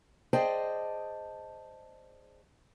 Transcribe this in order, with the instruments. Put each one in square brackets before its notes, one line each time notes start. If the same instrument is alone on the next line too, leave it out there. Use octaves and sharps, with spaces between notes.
[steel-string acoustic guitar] G#4 C5 D5 D#5 G5 A5